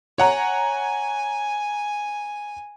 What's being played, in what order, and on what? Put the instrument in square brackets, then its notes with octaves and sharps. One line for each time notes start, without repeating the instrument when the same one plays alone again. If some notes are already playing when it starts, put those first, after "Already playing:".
[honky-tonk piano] C#5 F#5 A#5 [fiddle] G#5